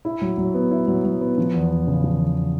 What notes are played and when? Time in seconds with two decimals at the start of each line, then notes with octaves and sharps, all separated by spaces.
0.05 E4
0.22 F#3
0.38 F#3
0.54 B3
0.71 E4
0.88 F#3
1.05 F#3
1.21 B3
1.38 F3
1.54 E2
1.71 E2
1.87 C#3
2.04 F3
2.21 E2